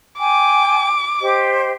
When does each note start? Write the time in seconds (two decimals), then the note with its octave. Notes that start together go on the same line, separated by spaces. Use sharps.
0.19 G5 G#5 D6
1.21 G4 C5 D#5